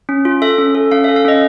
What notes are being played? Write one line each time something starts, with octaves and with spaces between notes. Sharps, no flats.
C#4
F4
A4 E5
C#4
A4
C#4 F5
E5
A4
F5
C#4 D#5